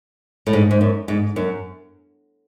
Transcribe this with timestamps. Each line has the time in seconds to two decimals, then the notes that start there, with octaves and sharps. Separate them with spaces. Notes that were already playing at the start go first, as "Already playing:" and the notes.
0.47 A2
0.53 G#2
0.71 G#2
0.81 F#2
1.08 G#2
1.36 F#2